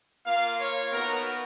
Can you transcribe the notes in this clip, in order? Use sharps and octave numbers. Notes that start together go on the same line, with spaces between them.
A#3 F4 F5
C#5
B3 D#4 F#4 A#4